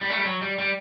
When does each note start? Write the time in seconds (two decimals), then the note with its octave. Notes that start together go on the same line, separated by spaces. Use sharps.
0.01 G3
0.10 A3
0.17 G3
0.25 F#3
0.42 G3
0.58 G3